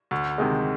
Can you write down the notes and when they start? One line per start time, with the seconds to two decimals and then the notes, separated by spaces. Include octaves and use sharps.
0.11 D2
0.38 C3 D#3 G#3